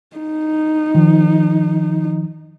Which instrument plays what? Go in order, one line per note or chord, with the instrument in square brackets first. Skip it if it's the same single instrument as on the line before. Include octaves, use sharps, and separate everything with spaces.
[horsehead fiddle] D#4
[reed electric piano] D#3 F3